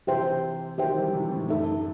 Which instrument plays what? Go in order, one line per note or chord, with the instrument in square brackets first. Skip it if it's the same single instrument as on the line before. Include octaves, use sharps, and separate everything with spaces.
[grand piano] C3 E3 [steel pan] G4 C5 E5 G5
[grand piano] D#3 F#3 [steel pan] G4 C5 E5 G5
[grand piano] E3 G3
C3 E3
A2 C3
[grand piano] F#2 [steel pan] D#4 A4 E5